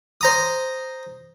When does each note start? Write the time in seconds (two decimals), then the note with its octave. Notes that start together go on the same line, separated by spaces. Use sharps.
0.21 C5 A#5 D#6